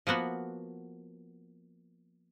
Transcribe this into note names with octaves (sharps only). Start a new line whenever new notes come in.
F3 A#3 B3 F#4